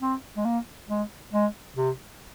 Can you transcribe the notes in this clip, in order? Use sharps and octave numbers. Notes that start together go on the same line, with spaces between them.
C4
G#3
A#3
G#3
G#3
C3